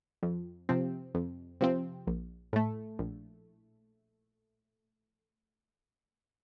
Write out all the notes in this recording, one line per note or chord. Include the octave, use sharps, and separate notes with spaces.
F2
C3 F3 C4
F2
C3 F3 C4
A#1
A2 A3
A#1